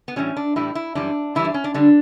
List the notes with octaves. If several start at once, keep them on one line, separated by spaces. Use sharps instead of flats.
B3
A2 E3 G3 C#4
D4
A2 E3 G3 E4
E4
F#2 E3 G3 D4
F#2 E3 G3 E4
D4
C#4
D4
D3 G3 D4